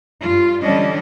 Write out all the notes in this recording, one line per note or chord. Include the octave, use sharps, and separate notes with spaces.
G2 F4
D3 E3 G3 C#4 D4 D#5